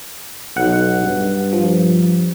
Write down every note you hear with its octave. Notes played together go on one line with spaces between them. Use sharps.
B1 F#5
G2
F3